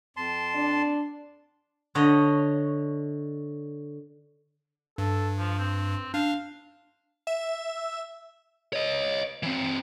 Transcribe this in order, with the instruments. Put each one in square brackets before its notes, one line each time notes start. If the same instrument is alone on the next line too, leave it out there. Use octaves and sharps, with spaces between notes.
[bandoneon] F2 A5 C6
[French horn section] D4
[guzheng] D3 C#5 D#5
[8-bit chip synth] G2 [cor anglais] A4
[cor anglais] F3
C4
[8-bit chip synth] D4 [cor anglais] F5
[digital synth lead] E5
[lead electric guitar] C#5 D#5
E3 C4